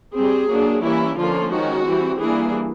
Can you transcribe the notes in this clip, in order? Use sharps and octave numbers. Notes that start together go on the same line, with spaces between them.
G3 C4 G#4
F#3 A#3 D4
E3 G3 A#3 C#4 E4
D3 F3 A#3 C#4 F4
D#3 G#3 C#4 F#4
E3 G3 C4
E3 G3 A#3 D4 G#4